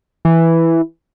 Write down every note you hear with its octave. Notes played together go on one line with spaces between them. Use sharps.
E3